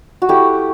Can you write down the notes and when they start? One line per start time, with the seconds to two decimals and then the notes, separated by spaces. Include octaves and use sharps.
0.22 F#4
0.29 A3 E4 G4